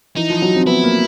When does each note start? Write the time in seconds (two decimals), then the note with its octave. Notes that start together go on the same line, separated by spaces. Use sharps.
0.16 E3 D#4
0.30 F3
0.42 F#3
0.55 C4
0.67 B3 E4
0.84 A#3